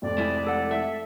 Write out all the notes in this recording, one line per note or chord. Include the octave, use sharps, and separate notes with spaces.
F1 F2 D5
G#3 E4
A4 F#5
A4 E5